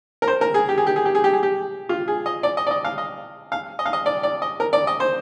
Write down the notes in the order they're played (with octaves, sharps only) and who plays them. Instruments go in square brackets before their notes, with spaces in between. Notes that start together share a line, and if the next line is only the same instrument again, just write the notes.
[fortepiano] A#4
C5
A#4
G#4
G4
G#4
G4
G#4
G4
G#4
G4
G#4
G4
F4
G#4
D#5
D5
D#5
D5
D#5
F5
D#5
F5
D#5
F5
D#5
D5
D5
D#5
A#4
D5
D#5
C5